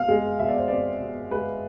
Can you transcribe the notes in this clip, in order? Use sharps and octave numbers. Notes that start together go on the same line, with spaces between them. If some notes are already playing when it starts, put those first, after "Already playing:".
Already playing: B2 F5
G#3
B2 E5
D5
C5
C4 D5
B2
G#3 B4